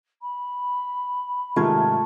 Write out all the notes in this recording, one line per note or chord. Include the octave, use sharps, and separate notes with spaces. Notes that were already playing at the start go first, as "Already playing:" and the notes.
B5
G#2 C3 D#3 G#3 A3 F4 G#6